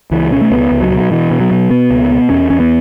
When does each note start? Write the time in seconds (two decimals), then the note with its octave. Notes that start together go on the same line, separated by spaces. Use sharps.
0.11 C#2 E3
0.31 B2 C#4
0.41 A3
0.51 C#2 B3
0.71 C#2
0.82 F#3
0.90 B2
1.11 B2 E3
1.31 B2
1.40 F#3
1.51 B2
1.71 B2 B3
1.90 C#2
2.11 B2
2.30 E2 C#4
2.50 E2 C#4
2.60 B3